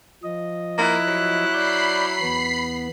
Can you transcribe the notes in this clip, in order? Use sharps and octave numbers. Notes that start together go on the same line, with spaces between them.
F3 D#5
A#3 E4 F#6
F#3
D5 B5 G6 C7
E2 B3